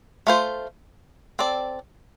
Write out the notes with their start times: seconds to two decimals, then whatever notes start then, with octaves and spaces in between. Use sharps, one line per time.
0.27 A3 F4 C5
1.39 C4 A4 D5